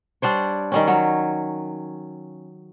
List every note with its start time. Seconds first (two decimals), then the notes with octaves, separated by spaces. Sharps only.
0.22 G3 D4 C5 C#5
0.72 D#3 G3 C#4
0.87 F#3 C#5